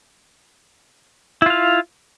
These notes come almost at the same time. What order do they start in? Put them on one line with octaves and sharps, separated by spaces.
E4 F4 F5